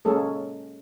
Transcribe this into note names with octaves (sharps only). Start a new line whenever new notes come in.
G#3 A#3 C#4 G#4 A4